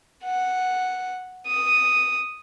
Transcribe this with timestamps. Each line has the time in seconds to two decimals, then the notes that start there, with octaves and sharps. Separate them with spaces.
0.24 F#5
1.47 D#6